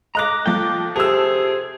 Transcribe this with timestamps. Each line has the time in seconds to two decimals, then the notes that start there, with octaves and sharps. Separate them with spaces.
0.15 D#5 A#5 D6 F#6 A#6
0.46 F3 A3 F4 G5 D6
0.96 C3 G#4 A4 E6